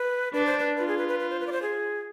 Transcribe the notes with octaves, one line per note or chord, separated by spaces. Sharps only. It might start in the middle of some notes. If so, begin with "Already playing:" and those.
Already playing: B4
D4 B4
C5
B4
F4 B4
G#4
B4
B4
B4
C5
B4
D5
C5
G#4